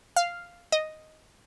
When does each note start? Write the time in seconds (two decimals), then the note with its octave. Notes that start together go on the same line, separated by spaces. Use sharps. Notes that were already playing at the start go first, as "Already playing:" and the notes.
0.16 F5
0.72 D#5